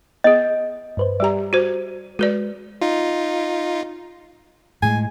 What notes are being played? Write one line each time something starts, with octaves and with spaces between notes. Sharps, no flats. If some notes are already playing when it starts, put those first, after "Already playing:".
B3 G#4 D#5 G6
G2 B4 C5
G3 G4 D5 A#5
F#4 C5
G#3 F#4 B4 D5
D#4 F4
A2 G#3 G#5